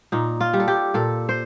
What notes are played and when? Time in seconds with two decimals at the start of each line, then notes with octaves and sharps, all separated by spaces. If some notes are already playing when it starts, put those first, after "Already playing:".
0.12 A#2 D#4
0.41 F4
0.54 G3
0.60 A4
0.68 G4
0.94 A#2 A4
1.29 C5